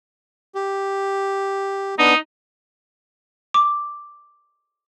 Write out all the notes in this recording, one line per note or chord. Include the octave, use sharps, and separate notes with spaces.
G4
B3 D4 D#4
D6